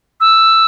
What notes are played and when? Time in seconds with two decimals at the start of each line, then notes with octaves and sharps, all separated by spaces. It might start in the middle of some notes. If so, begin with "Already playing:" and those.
0.21 E6